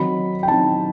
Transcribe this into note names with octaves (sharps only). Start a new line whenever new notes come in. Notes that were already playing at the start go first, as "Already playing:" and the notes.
Already playing: D#3 F#3 C4 D#4 B5
G5
D#3 F#3 C4 D#4 A5